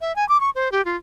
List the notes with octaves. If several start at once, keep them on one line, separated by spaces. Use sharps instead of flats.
E5
G#5
D6
C#6
C5
G4
F4